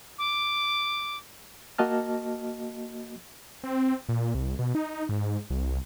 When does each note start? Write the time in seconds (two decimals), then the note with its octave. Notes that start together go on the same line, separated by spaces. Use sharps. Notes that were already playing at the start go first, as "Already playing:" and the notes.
0.18 D6
1.78 A#3 F#4 D#5 A5 F6
3.64 C4
4.09 A#2
4.35 C2
4.59 B2
4.75 D#4
5.09 G#2
5.50 C2